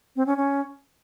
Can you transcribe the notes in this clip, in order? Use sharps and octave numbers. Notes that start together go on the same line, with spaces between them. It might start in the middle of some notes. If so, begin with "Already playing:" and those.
C4
C#4
C#4